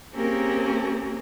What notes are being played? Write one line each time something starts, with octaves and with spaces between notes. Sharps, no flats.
A#3 C4 C#4 G4 G#4 A#4